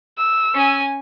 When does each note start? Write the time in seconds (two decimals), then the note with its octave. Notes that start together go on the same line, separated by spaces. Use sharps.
0.18 E6
0.54 C#4 G#5